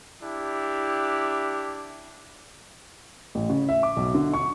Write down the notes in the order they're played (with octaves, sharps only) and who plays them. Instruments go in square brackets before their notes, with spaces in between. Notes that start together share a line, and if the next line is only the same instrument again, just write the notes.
[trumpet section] D4 E4 G4
[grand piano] A1
C#3
E5
D6
B1
D3
C#6